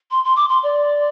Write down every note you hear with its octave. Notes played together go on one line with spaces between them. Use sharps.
C6
C6
D6
C6
D5